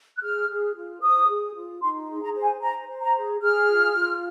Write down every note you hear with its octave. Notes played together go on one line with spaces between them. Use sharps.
F#6
G#4 F6
G#4
F4
C5 D#6
G#4
F4
D#4 C6
G#4
A#5
C5
G#5
C5 A#5
C5
A#5
G#4
G#4 F6
F4
F4